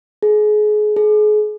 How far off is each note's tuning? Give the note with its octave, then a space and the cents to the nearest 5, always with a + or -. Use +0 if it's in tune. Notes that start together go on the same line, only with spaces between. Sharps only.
G#4 +30
G#4 +35